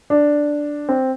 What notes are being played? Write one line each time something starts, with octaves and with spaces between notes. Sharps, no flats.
D4
C4